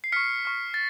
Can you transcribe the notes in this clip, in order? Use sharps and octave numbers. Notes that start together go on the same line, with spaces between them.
C7
C#6 F6 B6 C#7
C#6 F6
A6